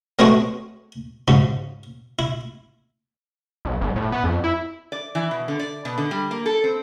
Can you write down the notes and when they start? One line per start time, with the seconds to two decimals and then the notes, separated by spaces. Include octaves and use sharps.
0.19 F#3 G#3 A3 B3 C4 F#4
1.28 G#2 C#3 F#3
2.19 E4
3.65 B1
3.81 G1
3.96 A2
4.12 B3
4.24 F2
4.44 E4
4.92 D5
5.15 E3
5.31 B2
5.48 D3
5.59 D5
5.85 B2
5.98 D3
6.11 G3
6.31 A#3
6.46 A4
6.64 C4